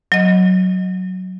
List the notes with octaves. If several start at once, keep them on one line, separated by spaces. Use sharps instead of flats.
F#3 D#5